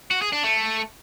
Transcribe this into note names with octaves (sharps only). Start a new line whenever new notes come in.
F#4
G#4
D4
A3